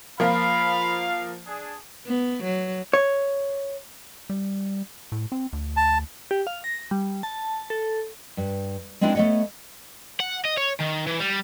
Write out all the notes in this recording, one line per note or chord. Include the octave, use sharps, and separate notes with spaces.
F3 A#3 F4 F5 B5
D4 G#4
B3
F#3
C#5
G3
A2
C4
D2
A5
G4
F5
A#6
G3
A5
A4
G2
G#3 B3 C4 D4 E4 G#4
A3 B3 C4 C#5 D#5 F#5
F#5
D#5
C#5
D#3
E3
G3